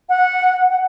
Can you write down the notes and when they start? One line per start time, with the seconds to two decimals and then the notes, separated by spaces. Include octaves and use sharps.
0.09 F#5
0.70 F#5